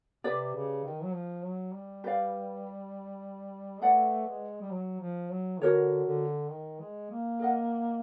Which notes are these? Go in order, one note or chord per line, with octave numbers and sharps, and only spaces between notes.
C3 G4 B4 D5
C#3
D#3
F#3
F3
F#3
G3
G4 B4 D5 F5
A3 B4 D5 F#5
G#3
G3
F#3
F3
F#3
D3 F#4 A#4 C#5
D3
D#3
G#3
A#3
A#4 D#5 F#5